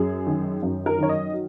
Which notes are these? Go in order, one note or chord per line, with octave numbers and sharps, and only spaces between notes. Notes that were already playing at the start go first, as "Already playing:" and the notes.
Already playing: F#2 G#4
D#3
F#2
A#4
D#3 C#5
D#5
F#3